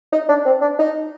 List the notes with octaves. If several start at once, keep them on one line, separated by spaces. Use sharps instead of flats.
D#4
D4
C4
D4
D#4